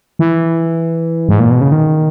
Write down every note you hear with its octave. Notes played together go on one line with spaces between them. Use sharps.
E3
G#2
A#2
B2
C#3
D#3